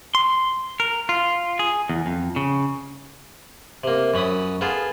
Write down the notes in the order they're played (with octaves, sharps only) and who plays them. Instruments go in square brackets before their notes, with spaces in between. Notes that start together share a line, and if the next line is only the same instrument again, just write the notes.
[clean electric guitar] C6
A#4
F4
G#4
E2
F2
C#3
[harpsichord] C3 A#3
F#2 F#3 B5 D#6
B3 F4 G#4 A4